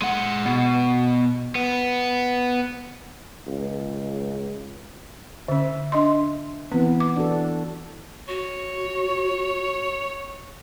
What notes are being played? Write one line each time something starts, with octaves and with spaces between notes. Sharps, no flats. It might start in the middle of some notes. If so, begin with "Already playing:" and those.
G#3 F#5
B2
B3
C#2
D3 C#4 E5
D4 D#5 C6
E3 B3 C4
D6
D4 F#4 A4
F#4 C#5